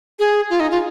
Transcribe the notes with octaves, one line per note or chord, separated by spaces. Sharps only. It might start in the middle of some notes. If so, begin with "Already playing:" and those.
G#4
F4
D#4
F4